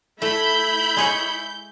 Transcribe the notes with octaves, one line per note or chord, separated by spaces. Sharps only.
A3 E4 B5 G6
G#3 G#4 C#5